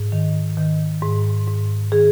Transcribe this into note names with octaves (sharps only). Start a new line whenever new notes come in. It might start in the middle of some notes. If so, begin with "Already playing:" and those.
Already playing: G#2
D#3
D#3
G#2
G#2
D#3 G#4